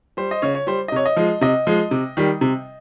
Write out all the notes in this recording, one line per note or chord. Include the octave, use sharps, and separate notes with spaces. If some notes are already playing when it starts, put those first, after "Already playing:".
G3 C5
D#5
C#3 C#5
C#5
G3 C5
D#5
C3 C#5
D#5
F3 G#3
C3 D#5
F3 G#3
C3
D#3 G3
C3